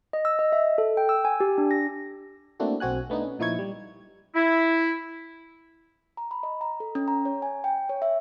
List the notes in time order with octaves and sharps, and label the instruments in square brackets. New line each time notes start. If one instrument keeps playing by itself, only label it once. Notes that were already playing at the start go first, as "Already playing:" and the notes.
[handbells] D#5
E6
D#5
E5
A4
G5
E6
G#5
G4
D4
A#6
[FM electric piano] A3 A#3 C4 D4 E4 F#4
B1 C4 F#4 G#5 F#6
A3 B3 D4 D#4
C#4
A#2 F3 D#4 E4 C#6 G#6
G3
[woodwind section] E4
[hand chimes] A#5
B5
D#5
A#5
A4
C#4
A#5
C#5
G#5
G5
C#5
E5